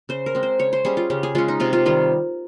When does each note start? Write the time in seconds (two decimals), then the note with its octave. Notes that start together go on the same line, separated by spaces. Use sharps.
0.09 C#3 C5
0.26 A#4
0.35 G#3 C4
0.43 C5
0.59 C#3 C#5
0.73 C5
0.85 G3 C#4 G#4
0.97 F4
1.10 C#3 G4
1.23 G#4
1.35 G#3 C#4 F4
1.48 D#4
1.60 C3 F4
1.73 F4
1.86 D#3 G3 F4